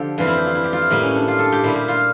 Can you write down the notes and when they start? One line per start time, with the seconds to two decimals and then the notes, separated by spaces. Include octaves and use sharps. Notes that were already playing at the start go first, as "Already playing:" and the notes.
Already playing: D3 F3 G4 A4
0.18 F2 E3 G3 F4
0.27 E4
0.36 G4
0.46 F4
0.55 E4
0.64 G4
0.73 F4
0.82 E4
0.90 A2 G3 A#3
1.03 C#4
1.15 D4
1.28 F4
1.39 A4
1.52 G4
1.63 A#2 G3 E4
1.76 G4
1.88 F4